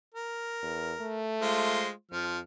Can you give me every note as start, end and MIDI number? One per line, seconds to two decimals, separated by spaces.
0.14 1.29 70
0.62 0.93 40
1.00 1.88 57
1.42 1.91 56
1.42 1.91 65
1.42 1.91 72
2.12 2.41 41
2.12 2.39 53
2.12 2.39 89